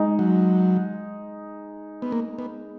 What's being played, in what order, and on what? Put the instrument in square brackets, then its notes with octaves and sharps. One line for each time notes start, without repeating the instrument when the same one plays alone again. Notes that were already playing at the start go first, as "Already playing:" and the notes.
Already playing: [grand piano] G#3 D#4 G#4
[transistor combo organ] F#3
B3
A#3
B3